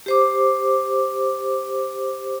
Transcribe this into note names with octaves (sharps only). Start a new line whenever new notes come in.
G4 C5 D6